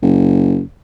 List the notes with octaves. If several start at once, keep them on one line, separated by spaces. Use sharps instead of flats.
F#1